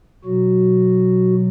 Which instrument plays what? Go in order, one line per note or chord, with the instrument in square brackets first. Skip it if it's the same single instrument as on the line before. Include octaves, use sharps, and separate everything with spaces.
[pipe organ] B2 F#3 F#4